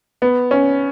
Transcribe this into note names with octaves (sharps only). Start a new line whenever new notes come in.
B3
C#4